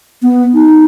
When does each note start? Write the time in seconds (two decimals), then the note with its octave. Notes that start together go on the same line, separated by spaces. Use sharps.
0.23 B3
0.54 D#4